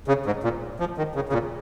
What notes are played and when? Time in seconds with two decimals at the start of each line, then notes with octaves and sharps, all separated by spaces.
0.08 C#3
0.26 G#2
0.44 A#2
0.80 F3
0.97 D#3
1.15 C#3
1.29 C#3
1.33 A#2